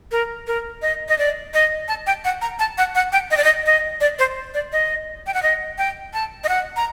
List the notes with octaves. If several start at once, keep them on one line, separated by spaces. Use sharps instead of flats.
A#4
A#4
D#5
D#5
D5
D#5
A5
G5
F#5
A#5
A5
F#5
F#5
G5
D#5
D5
D#5
D#5
D5
C5
D5
D#5
G5
F#5
D#5
G5
A5
D#5
F#5
A#5